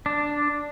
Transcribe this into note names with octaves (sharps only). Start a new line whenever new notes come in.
D4